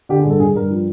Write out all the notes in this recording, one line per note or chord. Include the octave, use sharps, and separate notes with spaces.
D3 G4
G#4
G2 A4
G2 G#4
G2 A#4
F3